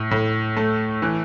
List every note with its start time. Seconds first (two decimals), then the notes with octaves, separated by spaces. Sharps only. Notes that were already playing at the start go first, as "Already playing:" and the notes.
Already playing: A2
0.11 A2
0.57 A3
1.02 E3